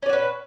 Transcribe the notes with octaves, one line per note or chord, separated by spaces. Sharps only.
C#4 F#4 B4 D5